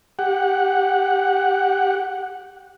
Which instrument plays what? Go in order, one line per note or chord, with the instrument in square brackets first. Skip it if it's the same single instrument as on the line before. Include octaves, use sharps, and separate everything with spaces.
[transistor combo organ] G4 F#5